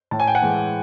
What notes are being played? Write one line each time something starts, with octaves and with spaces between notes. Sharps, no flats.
A2 A5
G#5
G5
F#5 G#5
E3 G#3